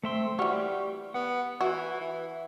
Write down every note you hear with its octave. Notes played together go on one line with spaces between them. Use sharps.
A3 C4 E5 C6
E3 G3 F#4 G4 C#6 F6
B3 F#5
E3 F#4
E3